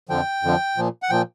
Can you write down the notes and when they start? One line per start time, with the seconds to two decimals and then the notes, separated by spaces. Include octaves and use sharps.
0.09 F2 D3 F3 G5
0.43 F2 D3 F3
0.77 A#2 F3
1.02 F#5
1.10 A#2 F3 G5